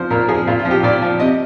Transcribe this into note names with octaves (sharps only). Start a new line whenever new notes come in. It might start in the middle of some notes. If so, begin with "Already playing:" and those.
Already playing: F3 C5
A#2 A#4
F3 G#4
A#2 F4
F4
F3
G4
A#2 D5
F3
C3 D#5